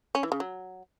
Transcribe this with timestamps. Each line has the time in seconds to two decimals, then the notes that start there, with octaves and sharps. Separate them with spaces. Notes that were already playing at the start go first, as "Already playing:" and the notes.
0.15 C#4
0.23 E3
0.32 C#3
0.40 F#3